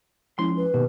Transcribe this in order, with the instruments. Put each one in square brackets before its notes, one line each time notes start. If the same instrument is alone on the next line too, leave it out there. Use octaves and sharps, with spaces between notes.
[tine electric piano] F3 G#3 C#4 [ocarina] E4 [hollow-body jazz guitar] C6
[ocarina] B4
[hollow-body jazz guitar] B2 [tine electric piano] D#3 A#3 G4